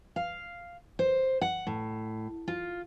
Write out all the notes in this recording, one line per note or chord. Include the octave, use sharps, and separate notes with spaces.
F5
C5
F#5
A2
F4